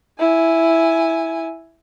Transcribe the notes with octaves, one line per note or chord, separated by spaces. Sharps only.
E4 G#5